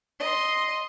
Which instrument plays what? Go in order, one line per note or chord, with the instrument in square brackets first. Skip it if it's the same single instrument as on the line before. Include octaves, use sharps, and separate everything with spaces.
[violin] D#5 C6